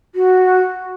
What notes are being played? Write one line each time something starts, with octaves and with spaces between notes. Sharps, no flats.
F#4